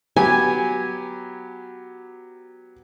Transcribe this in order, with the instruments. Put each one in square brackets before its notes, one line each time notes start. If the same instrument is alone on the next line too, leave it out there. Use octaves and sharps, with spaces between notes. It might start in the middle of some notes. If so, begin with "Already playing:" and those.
[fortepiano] F#3 B3 G4 [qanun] G#5